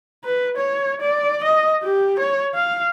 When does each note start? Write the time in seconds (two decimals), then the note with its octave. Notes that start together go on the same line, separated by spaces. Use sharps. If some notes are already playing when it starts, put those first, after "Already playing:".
0.24 B4
0.57 C#5
1.01 D5
1.44 D#5
1.83 G4
2.19 C#5
2.55 F5